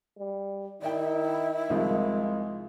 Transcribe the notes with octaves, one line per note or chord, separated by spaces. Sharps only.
G3
D#3 D#4 E4 D5 E5 G5
C2 D#3 F3 G#3 F4